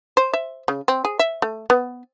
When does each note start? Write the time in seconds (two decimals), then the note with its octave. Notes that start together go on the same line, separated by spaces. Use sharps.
0.17 C5
0.33 E5
0.68 C#3
0.88 C4
1.05 G#4
1.19 E5
1.42 A3
1.70 B3